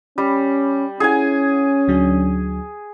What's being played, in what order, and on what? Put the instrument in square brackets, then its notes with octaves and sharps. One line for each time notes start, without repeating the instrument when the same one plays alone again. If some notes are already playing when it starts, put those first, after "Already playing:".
[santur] G3 [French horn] C#4
[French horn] C#4 [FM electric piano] E4 F#5 [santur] G#4 G#5
[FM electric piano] D2 F#3 D4